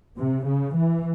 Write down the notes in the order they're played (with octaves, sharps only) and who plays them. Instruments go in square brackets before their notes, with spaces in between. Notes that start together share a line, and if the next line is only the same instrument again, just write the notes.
[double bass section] C3
C#3
E3